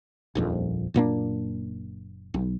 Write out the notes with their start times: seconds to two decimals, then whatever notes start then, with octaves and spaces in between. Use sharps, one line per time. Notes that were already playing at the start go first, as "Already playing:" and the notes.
0.35 D#1 A#1 F2
0.94 F#1 A#2 A#3 D4
2.34 B1